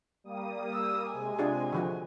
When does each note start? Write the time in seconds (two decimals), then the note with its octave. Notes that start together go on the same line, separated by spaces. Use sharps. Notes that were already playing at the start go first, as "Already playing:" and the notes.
0.24 G3 A#3 D#6
0.73 E6
1.10 C3 G#3 G#5
1.39 D4 F4 G#4
1.72 D3 F3 F#4